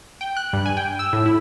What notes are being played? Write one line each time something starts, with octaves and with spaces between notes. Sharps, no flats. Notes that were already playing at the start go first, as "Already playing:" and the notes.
G5
F#6
G2
G#5
G5
E6
A2
E4